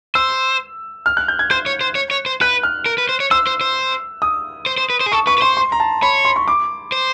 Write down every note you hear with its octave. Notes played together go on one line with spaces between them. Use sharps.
C5 E6
F6
F#6
G6
G#6
C5 G6
C#5
C5
C#5
C#5
C5
B4 F#6
F6
A#4
B4
C5
C#5
C5 E6
C5
C5
D#6
C5
C5
B4
C5
G#4
A4 C#6
B4 C#6
B4
C5 C6
C6
A#5
A5
C#5 B5
C6
C#6
D6
C5